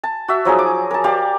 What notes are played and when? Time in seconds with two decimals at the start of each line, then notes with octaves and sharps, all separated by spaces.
0.03 A5
0.28 F#4 E5
0.45 F3 F#3 D#4 G#4
0.59 D6
0.91 A#4 A5
1.04 G4 A#4 D5 F5